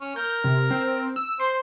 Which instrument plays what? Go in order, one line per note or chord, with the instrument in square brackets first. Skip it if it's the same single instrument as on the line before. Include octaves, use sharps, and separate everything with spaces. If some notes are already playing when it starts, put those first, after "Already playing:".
[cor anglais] C#4
[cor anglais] A#4 [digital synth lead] G6
[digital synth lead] C3
C4
E6
[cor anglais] C5 [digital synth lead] C6